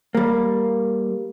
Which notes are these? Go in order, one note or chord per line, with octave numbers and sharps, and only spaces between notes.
G3 A#3